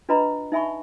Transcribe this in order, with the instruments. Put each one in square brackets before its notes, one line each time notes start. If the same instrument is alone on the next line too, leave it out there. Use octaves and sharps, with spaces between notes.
[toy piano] D4 F4 B4 D#5 A#5 B5
D#4 E5 G#5 B5 C#6